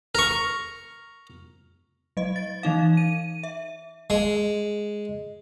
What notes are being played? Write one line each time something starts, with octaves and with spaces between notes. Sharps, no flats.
A#4 C#6
F#3 D#5
A6
E3 D#4 F5
D#7
E5
G#3